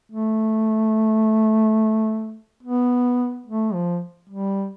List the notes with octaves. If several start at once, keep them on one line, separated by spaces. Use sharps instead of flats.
A3
B3
A3
F3
G3